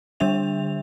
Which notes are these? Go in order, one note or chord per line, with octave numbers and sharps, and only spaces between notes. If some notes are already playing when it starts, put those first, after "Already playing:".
D3 G3 D4 E5 F7